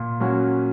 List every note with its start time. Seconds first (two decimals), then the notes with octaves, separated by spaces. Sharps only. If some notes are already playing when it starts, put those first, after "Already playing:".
Already playing: A#2
0.20 F#3 A#3 C#4 F#4